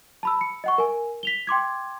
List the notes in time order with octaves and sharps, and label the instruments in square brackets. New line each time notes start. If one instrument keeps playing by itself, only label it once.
[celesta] A5 B5 E6
C#7
D#5 F#5 C#6
A#4 G#5
B6 F7 G7
G5 C6 D6 G#6